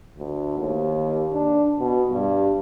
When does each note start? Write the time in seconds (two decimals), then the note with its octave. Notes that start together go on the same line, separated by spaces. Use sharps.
0.18 D2
0.58 D#2
1.33 D4
1.79 B2
2.12 G2